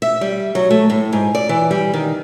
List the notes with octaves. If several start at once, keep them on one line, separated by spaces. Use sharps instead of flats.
E5
G3
F#3
A3
A2
G#2
D5
E3
G3
D#3